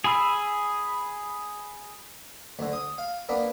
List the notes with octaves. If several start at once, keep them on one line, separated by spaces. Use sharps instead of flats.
G#4 G#5 B5 E6
D2 D3
D#6
F5
A#3 B3 D4